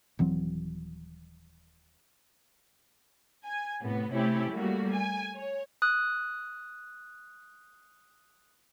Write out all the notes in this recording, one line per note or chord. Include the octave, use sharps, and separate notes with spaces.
D#1 E3 F#3 C4
G#5
A2 C3 B3
C3 A3 C#4 E4 G4
G3 A3 A#3 F#4
G#5
C#5
D#6 F#6